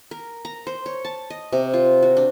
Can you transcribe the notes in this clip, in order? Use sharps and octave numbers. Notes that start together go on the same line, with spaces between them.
A#4
A#5
C5
C#5
A5
D#5
C3
F4
F#4
D4